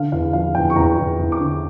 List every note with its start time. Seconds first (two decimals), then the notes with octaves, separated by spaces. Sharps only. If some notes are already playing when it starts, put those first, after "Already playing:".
Already playing: D3 F5
0.12 E2 F5
0.33 F3 F5
0.55 E2 G5
0.70 C#6
0.75 E2 A#5
0.98 E2
1.19 E2
1.32 D6
1.40 D3